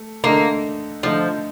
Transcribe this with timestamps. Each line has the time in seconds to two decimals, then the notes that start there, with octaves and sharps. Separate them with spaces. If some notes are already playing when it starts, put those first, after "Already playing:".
Already playing: A3
0.24 D3 A3 A#3 D#4
1.03 D3 F3 A3 D#4